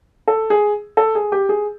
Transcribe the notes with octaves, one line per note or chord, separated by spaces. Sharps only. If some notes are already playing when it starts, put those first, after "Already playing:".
A4
G#4
A4
G#4
G4
G#4